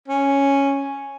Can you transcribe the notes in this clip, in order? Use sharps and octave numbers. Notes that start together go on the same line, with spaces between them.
C#4